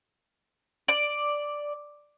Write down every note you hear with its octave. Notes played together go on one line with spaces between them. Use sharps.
D5